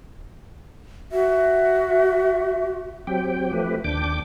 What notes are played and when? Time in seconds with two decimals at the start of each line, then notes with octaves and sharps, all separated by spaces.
1.12 F#4 E5
3.07 F#3 C4 G4 G5
3.53 F3 A3 G4 B4
3.84 D#2 D4 G5 D6